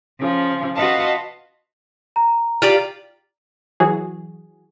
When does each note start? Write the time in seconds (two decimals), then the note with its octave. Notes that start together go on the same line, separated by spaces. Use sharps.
0.19 C#3 F3
0.76 F4 F#4 B4 D#5 F5 A5
2.16 A#5
2.62 F4 G4 D5
3.80 E3 F#3 F#4 G#4